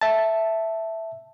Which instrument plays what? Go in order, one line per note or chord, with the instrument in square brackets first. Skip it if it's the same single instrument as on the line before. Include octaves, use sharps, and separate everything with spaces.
[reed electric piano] E5 A5